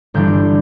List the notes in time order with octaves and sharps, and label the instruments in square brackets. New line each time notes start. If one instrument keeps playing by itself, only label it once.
[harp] G1 G2 E3 G3 D4 G6